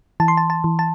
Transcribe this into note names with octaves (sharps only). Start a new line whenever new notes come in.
E3 A5
C6
A5
A5
E3
A5